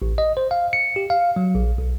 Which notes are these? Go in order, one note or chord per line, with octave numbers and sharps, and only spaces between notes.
A1
D#5
C5
F5
C#7
G4
F5
F#3
A#1
B1